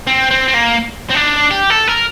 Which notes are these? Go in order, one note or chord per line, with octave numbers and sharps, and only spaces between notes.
C4
C4
C4
A#3
C4
D4
G4
A4
A#4